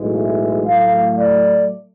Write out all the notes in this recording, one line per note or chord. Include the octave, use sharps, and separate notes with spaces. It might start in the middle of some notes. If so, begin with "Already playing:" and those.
Already playing: B1 A2 E3 G#3
E5
A2 F#3 A3 F5
D5